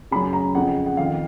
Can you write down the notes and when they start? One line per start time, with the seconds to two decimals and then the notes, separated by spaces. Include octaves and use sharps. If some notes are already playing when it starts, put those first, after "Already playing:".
0.11 C#3 B5
0.15 F#2
0.33 A#5
0.55 F2 C#3 F#5
0.86 F#5
0.97 F2 D#3 F5